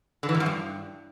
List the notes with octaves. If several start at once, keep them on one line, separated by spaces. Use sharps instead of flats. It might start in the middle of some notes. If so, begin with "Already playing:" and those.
D3
E3
G#2
F#2
G2